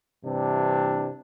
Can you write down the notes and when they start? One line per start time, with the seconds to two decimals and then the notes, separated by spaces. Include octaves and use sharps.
0.25 G2 C3 E3 D4